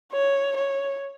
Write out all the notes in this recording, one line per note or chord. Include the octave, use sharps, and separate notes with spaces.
C#5
C#5